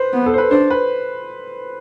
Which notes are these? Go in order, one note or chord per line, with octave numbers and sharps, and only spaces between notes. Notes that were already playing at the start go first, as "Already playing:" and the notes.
Already playing: B4 C5
B3
A4
C5
B4
D4 C5
B4